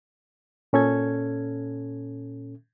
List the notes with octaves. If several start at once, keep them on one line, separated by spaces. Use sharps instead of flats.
A#2 C#4 A4 G#6